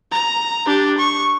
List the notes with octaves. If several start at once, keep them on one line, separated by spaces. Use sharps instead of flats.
A#5
D4 G4
C#6